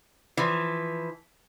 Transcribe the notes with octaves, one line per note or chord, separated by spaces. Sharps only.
E3 F3